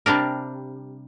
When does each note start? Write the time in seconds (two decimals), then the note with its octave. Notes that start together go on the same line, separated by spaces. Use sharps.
0.06 C3 G3 D4 A#4